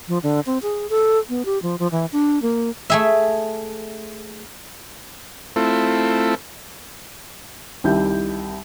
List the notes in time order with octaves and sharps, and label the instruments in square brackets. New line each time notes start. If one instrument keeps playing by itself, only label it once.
[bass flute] F3
D3
C4
G#4
A4
B3
G4
F3
F3
E3
D4
A#3
[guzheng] A3 G#4 E5
[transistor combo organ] A3 C4 E4 F4 A4
[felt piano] C2 D#3 E4 G4 G6